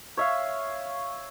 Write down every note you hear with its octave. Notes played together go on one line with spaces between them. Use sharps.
C#5 E5 F5